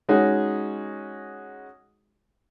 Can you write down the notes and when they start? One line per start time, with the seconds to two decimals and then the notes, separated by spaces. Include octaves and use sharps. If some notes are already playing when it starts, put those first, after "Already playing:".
0.09 G#3 C#4 D#4 F#4 G#4